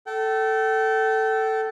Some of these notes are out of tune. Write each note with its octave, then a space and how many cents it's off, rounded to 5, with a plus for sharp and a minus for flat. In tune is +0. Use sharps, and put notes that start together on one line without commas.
A4 +0 G5 -35